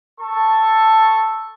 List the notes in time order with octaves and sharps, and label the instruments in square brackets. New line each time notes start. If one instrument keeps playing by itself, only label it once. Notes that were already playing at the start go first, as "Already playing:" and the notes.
[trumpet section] A4 A5 C#6